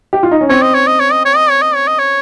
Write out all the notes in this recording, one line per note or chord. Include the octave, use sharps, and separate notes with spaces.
G4
F4
D#4
C#4
C4 C#5
D#5
C#5
D#5
C#5
D#5
C#5
D#5
C#5
D#5
C#5
D#5
C#5